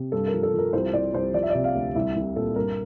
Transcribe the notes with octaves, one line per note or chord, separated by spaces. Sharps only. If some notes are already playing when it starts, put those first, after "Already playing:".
Already playing: C3
G2 A4
A#4
F3
A4
F3 A#4
C2 C5
C2 D5
C2 C5
F3 D5
E5
C3 D5
F5
D2
C2 E5
C2
A#2 A4
G2 A#4